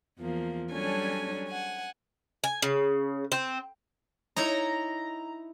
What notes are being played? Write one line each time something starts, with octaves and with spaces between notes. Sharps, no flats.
E2 F3 A#3
F#3 G3 C#4 D4 A4 G#5
F#5 G#5
G#5
C#3
C4
D#4 E4 C#5 A#5